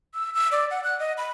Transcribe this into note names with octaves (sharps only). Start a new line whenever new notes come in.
E6
E6
D5
F#5
F#6
D#5
B5